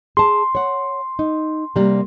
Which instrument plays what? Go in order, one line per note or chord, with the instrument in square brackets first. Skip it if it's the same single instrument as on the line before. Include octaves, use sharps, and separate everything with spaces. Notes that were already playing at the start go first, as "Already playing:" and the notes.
[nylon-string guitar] G#4 A5 [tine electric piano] C6
[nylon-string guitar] C#5 F#5
D#4
C3 G3 A#3